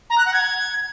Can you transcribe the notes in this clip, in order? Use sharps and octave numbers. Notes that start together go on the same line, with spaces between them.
A#5
F#6
F#5
G#6